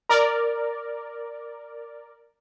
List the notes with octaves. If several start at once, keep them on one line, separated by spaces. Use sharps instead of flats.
A#4 D5